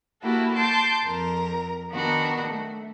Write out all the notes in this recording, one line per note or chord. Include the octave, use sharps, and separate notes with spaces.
A#3 E4 F#4 G4 A4
A5 C6 D6 G6
F2 A#4
D#3 B3 D4 D#4 F#4 A#4
A3